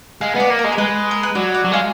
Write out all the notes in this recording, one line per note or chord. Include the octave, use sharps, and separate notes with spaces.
G#3 F5
B3
D5
A#3
A#4
G#3
A#4
G#3 B4
A#4
B4
F#3 D5
D5
F#3
G#3 F5